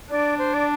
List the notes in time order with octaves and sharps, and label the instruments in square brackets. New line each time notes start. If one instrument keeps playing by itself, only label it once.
[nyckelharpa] D4 [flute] D5
[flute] C5
D5